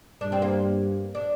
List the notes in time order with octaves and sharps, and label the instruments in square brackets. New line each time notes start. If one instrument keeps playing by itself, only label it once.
[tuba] G2 [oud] D4
[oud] C4
A#3
D4